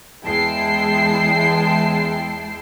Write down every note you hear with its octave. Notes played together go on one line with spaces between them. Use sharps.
E2 G#3 E4 G5 A5 C7